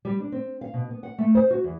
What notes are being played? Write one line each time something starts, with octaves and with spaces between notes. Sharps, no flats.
G3
D4
C4
F5
B2
B3
F#5
A3
C5
F#4
E2